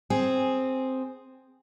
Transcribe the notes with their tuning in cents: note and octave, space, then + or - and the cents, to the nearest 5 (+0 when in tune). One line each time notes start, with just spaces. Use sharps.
C4 +0 G#4 +0